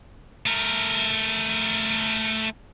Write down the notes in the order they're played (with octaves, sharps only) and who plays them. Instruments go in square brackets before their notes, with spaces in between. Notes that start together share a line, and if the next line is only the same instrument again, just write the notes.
[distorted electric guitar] A3 A#4